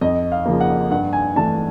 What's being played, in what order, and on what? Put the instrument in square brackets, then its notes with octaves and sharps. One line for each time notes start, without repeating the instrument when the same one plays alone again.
[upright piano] F2 D#5
F5
C#3 F3 A#3
F#5
G2 F#5
G#5
E3 A3 D4 A5